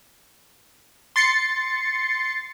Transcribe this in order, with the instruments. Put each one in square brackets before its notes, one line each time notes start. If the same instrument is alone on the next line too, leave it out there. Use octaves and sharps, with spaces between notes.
[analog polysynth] C6 A6 C7 C#7